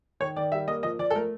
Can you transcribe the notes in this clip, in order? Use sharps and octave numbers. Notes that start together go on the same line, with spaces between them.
D#3 C#5
D#3 D5
G3 E5
A#3 D#5
F3 D#5
F3 D5
A4
A3 A#4